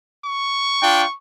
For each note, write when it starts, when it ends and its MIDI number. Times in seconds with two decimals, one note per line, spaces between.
0.25 1.14 85
0.82 1.04 62
0.82 1.04 65
0.82 1.04 79